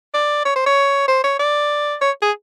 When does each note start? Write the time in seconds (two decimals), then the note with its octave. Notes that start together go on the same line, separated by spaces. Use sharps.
0.14 D5
0.45 C#5
0.56 C5
0.66 C#5
1.08 C5
1.24 C#5
1.39 D5
2.02 C#5
2.22 G#4